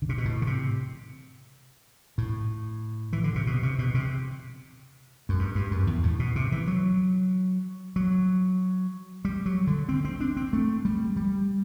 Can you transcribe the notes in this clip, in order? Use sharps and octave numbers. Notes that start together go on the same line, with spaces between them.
D3
C3
B2
A2
D3
C3
A2
E3
D3
C3
B2
C3
B2
C3
F#2
G2
G2
F#2
E2
A2
B2
C3
E3
F#3
F#3
G3
F#3
D3
C4
C4
D4
C4
A3
G3
G3